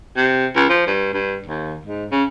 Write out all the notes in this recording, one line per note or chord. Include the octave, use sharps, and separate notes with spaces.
C3
C#2
F3
G2
G2
D#2
G#2
C#3